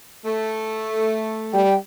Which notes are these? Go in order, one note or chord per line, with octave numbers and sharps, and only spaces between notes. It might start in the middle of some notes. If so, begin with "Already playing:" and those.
A3
G3 G5